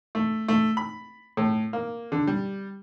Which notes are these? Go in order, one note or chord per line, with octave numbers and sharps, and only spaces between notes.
A3
A3
B5
A2
A#3
D3
G3